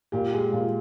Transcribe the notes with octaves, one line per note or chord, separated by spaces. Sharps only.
A#2 G4
G#3
A#2